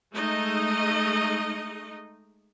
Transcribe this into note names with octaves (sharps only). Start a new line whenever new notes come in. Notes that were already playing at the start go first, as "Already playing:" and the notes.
G#3 A3 D#4 D#5